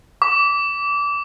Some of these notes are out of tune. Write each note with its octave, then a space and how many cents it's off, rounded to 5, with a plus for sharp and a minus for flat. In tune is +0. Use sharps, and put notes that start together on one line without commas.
D6 -25